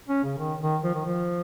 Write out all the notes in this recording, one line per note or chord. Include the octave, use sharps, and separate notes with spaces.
C#4
C#3
D#3
D#3
F3
D#3
F3